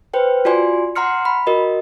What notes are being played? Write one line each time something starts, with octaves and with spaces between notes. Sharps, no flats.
B4 C5 G5
F4 F#4 D5 G#5 C6
F#5 A#5 C6 F6 C#7
B5
F#4 A#4 D#5